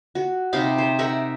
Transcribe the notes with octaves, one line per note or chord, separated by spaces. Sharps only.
F#4
C3 D#4 F5 B5
C5
D#4 A#4 E5 F#5